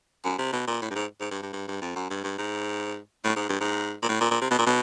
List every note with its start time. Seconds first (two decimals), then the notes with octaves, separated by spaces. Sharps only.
0.25 F#2
0.39 C3
0.53 B2
0.68 A#2
0.82 A2
0.91 G2
0.95 G#2
1.21 G#2
1.31 G2
1.42 G2
1.53 G2
1.68 G2
1.82 F2
1.96 F#2
2.10 G2
2.24 G2
2.38 G#2
3.25 A2
3.36 G#2
3.49 G2
3.60 G#2
4.02 A#2
4.09 A2
4.21 A#2
4.31 A#2
4.41 C3
4.51 B2
4.59 A#2
4.67 B2